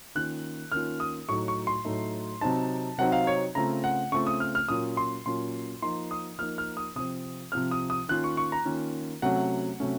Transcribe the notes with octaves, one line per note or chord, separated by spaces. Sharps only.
D#3 A#3 C#4 F4 F#6
D#3 A#3 C#4 F4 F6
D#6
A2 F#3 A3 D#4 C#6
C#6
C6
A2 F#3 A3 D#4
C3 F#3 C4 D#4 A5
C3 F#3 C4 D#4 F#5
F5
C#5
C#3 A3 C4 F4 A#5
F#5
C#3 A3 C4 F4 C#6
D#6
F6
F6
A#2 F#3 A#3 C#4 F4 D#6
C6
A#2 F#3 A#3 C#4 F4 C6
F3 A#3 D#4 C6
D#6
F3 A#3 D#4 F6
F6
D#6
C3 F3 C4 D#6
C3 F3 C4 F6
D#6
D#6
D#3 A#3 C#4 F4 F#6
C#6
C#6
A#5
D#3 A#3 C#4 F4
C3 F#3 A3 C#4 F#5
C3 F#3 A3 C#4